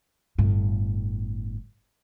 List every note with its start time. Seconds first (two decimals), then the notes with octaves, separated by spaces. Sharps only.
0.38 G1 A2